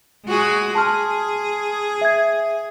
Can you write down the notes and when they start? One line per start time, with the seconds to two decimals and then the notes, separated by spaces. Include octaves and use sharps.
0.26 G#3 F#4 G#4
0.75 G#4 A5 C6 F6
2.01 E5 G#6